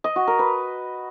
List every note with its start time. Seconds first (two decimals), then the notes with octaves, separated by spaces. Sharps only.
0.04 D#5
0.16 F#4
0.27 A#4
0.39 B4